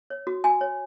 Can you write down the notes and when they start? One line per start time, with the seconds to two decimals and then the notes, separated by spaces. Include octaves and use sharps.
0.10 C#5
0.27 F#4
0.44 F#4 G#5
0.61 C#5